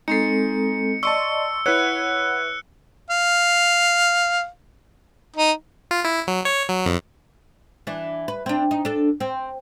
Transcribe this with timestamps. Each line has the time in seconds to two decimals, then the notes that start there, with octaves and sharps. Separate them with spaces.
0.08 G#3 C4 D#4 A4 C7 C#7
1.03 D5 D#5 A5 C6 C#6 E6 C#7
1.66 E4 B4 C#5 F#5 F#6 C#7
3.10 F5
5.36 D#4
5.91 F4
6.05 E4
6.27 F#3
6.45 C#5
6.69 F#3
6.86 F2
7.87 E3 D4
8.28 B4
8.46 C4 D4
8.71 D#4
8.85 D4 A4
9.20 C4